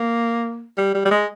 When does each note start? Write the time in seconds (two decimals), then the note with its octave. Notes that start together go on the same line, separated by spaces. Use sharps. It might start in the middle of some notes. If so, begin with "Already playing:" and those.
Already playing: A#3
0.78 G3
0.94 G3
1.05 G3
1.11 G#3